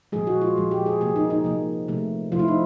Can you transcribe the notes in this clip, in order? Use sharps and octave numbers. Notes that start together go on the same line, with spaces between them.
A#2 F3 G#3 G#4
F#4
F4
A#2 F3 G#3
G4
G#4
C3 F3 A#3 G#4
D#4
D#4
C3 F3 A#3
C3 F3 A3
C3 F3 A3 F4
E4
D#4